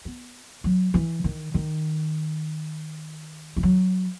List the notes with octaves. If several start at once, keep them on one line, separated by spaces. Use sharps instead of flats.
B3
F#3
E3
D#3
D#3
E3
F#3